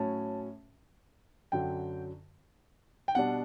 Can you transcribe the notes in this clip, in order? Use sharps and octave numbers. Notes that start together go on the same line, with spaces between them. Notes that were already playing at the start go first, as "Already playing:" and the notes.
Already playing: A2 F#3 C#4 A5
F#2 D3 F#3 G5
G5
B2 G3 D4 F#5